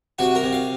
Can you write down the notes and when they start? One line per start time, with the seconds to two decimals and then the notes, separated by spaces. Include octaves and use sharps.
0.19 C3 F#4
0.35 A#4
0.43 C3
0.53 F5